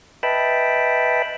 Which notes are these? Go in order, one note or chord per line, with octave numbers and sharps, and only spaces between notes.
B4 D#5 E5 G5 A5 B5